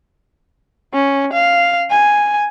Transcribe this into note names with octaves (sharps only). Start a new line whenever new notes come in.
C#4
F5
G#5